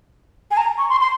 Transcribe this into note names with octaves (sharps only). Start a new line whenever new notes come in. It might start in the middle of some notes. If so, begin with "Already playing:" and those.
G#5
A#5
C#6
C6
C6